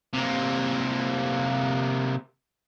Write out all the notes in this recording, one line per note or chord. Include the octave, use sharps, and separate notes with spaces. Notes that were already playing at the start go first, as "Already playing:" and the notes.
C3 A#3